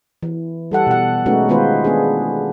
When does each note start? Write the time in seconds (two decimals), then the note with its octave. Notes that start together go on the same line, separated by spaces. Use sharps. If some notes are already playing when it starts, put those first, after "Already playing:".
0.23 E3
0.71 G3 A4 F#5
0.87 B2 F#5
1.26 G#3 A3 B3 C#4 D#4 F#4
1.49 D#3 G#3 B3 F4 B4 C5
1.84 B3 D4 G#4